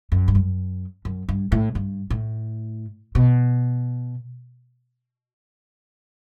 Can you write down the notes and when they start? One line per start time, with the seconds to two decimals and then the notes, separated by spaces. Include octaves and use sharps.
0.12 F#2
0.28 G2
0.35 F#2
1.05 F#2
1.29 G2
1.52 A2
1.75 G2
2.10 A2
3.15 B2